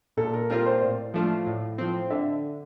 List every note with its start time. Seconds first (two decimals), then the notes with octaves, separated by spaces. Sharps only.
0.17 A#2 A4
0.34 A#4
0.50 G3 C4 F4 A#4
0.66 C5
0.81 A2 D5
1.14 F3 A3 D4 F4
1.46 A2
1.78 F3 C4
2.10 D3 E5